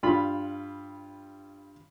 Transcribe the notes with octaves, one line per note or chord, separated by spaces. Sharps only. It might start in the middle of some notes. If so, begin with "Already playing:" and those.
G2 F4 B5